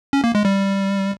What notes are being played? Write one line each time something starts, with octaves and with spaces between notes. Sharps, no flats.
C#4
A#3
G#3
G3